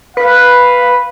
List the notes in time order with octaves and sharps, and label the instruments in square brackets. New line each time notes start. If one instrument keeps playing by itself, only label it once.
[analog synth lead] B4 [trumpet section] F5